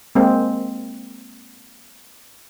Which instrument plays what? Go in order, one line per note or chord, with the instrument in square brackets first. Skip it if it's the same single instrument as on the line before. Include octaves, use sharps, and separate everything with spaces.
[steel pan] G#3 A#3 C4